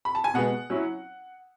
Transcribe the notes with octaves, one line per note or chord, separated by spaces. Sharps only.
B5
A5
G#5
B2 G#3 B3 F#5
F#3 C#4 E4